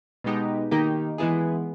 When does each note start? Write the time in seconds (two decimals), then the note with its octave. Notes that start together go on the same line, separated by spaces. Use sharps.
0.24 B2 G#3 B3 D#4 G4
0.71 D#3 A#3 D#4 G4
1.18 E3 G#3 B3 E4 G#4